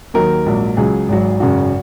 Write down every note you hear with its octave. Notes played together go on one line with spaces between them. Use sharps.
D#2 D#3 F#3 A#4
A#1 G#2 F#3
C#2 C#3 F#3 G#4
G#1 G#2 F#3
G#1 F#2 C#3 F#4